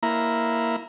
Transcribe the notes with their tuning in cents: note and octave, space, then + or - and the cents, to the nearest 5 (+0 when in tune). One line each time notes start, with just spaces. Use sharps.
A#3 +0 E4 +0 A#5 +0